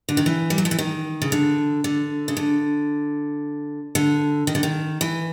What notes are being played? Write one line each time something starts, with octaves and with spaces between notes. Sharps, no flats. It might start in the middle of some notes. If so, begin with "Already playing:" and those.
D3
D#3
E3
G3
F#3
F3
E3
D#3
C#3
D3
D3
C#3
D3
D3
D#3
D3
D#3
E3